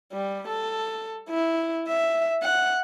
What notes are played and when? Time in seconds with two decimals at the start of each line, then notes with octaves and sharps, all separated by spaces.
0.13 G3
0.48 A4
1.30 E4
1.88 E5
2.42 F#5